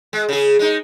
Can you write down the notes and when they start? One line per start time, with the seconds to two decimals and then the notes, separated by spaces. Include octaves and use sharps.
0.13 G#3
0.29 C#3 G#4
0.59 G#3 D#4